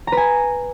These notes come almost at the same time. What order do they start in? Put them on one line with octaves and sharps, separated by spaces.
A#5 B4 G#5